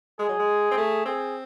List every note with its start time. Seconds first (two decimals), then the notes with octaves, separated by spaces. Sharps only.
0.19 G#3 G#4
0.29 F#3
0.40 G#3
0.71 C4
0.77 A3
1.05 C4 G#4